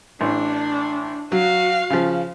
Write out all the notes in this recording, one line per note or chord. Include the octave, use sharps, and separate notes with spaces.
A1 D4
F#3 F#4 F5
C#3 F3